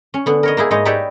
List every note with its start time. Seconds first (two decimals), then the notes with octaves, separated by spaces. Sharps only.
0.14 C#4
0.26 D3 B3
0.43 A#4 C#5 D#5
0.57 A#3 D#4 E4 G#4
0.71 G#2 G#3 D#4 C#5 D#5
0.85 D#4 G4 B4 C#5 D5 E5